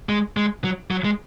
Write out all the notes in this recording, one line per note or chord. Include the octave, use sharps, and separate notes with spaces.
G#3
G#3
F#3
F#3
G#3